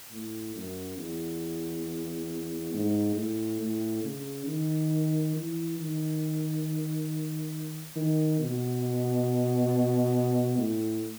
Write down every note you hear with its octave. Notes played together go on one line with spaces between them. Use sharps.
A2
F#2
E2
G#2
A2
A2
C#3
D#3
E3
D#3
D#3
B2
A2